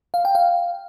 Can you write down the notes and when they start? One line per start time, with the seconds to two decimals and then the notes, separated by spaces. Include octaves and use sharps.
0.14 F5
0.25 G5
0.35 F5